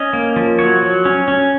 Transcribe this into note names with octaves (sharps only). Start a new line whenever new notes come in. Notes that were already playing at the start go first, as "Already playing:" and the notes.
Already playing: C#4 D#5
A#3
F3
F#3 C#5
F#3
C#4
C#4